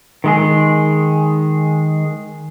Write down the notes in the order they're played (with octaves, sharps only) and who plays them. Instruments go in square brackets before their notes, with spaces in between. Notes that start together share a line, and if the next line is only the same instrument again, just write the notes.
[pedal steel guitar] D#3 G#3 G#4